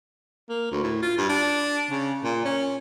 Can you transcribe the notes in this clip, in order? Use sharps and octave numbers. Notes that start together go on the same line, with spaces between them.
A#3
D2
A2
F4
G2
D4
C#3
A#2
C#4